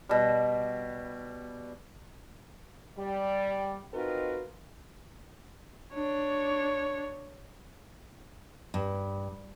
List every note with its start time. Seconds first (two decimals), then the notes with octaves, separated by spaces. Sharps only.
0.09 B2 G3
2.98 G3
3.93 C4 D#4 F4 F#4 A#4 B4
5.94 D4 C#5
8.74 G2